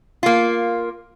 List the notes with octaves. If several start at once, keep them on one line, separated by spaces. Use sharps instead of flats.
A#3 F4